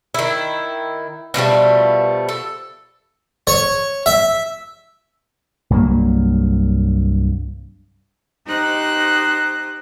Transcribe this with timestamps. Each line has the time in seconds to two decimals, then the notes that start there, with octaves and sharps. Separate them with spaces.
0.14 D#3 E4
1.34 B2 F3 G3 A3
2.29 A4
3.47 C#5
4.06 E5
5.70 C2 G2 F#3 A#3
8.47 D#4 G4 C5 F#6